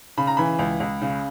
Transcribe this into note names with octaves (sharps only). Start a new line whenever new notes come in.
C#3 B5
A#5
E3 B5
C#2
C#2
C#3